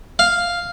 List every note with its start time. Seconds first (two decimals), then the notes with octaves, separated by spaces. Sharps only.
0.19 F5